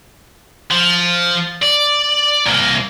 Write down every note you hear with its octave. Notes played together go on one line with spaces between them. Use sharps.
F3
D5
C2 A#3